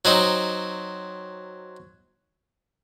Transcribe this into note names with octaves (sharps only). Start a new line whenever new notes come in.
F#3 C4 D#4